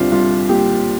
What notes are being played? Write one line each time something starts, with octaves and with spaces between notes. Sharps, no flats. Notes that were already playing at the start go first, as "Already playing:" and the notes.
Already playing: C2 G3 C4 D4 F4
C2 F4
A#2 G4